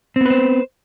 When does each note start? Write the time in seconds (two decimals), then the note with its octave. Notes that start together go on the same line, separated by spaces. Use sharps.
0.16 C4
0.21 B3
0.26 B4
0.30 C5